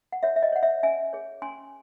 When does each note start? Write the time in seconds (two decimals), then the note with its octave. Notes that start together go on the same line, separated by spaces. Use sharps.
0.12 F#5
0.23 F#4 C#5 E5
0.36 E5
0.43 D#5
0.52 C#5
0.56 F#5
0.62 C#5 E5
0.83 C#4 E5 G#5
1.13 G#4 C#5
1.42 C#4 G#5 C6